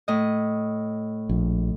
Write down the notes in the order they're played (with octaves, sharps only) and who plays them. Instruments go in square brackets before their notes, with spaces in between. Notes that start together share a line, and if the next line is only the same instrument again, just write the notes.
[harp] A2 D#5
[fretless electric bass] A#1